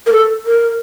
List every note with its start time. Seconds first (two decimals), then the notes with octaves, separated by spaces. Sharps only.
0.07 A#4
0.13 A4
0.46 A#4